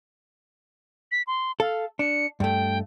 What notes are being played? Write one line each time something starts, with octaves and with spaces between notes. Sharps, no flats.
B6
C6
A4 F5
D4 C#7
G2 A3 G5